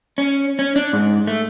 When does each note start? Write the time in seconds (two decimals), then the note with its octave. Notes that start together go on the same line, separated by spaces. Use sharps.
0.18 C#4
0.59 C#4
0.76 D4
0.93 G#2
1.27 A3